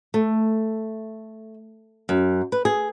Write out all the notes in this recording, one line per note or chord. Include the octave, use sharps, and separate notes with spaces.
A3
F#2
B4
G#4